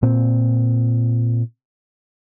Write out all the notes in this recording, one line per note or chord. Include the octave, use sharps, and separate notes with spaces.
A#2 C4